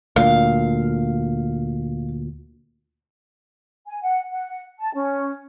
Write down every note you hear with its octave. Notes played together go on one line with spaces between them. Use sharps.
D2 A#2 F5
G#5
F#5
F#5
A5
C#4